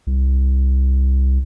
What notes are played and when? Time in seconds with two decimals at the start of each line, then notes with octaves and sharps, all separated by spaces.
0.07 C2